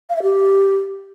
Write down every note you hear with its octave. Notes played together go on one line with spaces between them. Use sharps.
F5
E5
G4